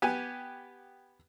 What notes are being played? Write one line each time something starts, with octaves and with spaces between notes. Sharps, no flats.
B3 G4 G#5